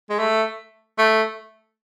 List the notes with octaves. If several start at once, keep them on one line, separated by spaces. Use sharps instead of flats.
G#3
A3
A3